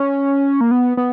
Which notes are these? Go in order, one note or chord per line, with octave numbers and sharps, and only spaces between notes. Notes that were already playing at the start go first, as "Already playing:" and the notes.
Already playing: C#4
A#3
B3
B3